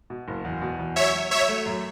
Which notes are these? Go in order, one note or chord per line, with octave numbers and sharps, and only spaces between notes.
B2
F#1
E2
B2
E2
F#3 C#5 E5
F#3
F#3 C#5 E5
A3
F#2